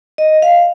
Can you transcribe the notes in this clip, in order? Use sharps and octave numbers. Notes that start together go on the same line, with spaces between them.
D#5
F5